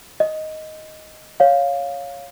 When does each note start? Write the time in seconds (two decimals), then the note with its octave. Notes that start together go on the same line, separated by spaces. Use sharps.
0.20 D#5
1.40 C#5 F5